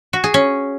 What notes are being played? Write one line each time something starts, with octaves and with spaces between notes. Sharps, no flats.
F#4
G#4
C#4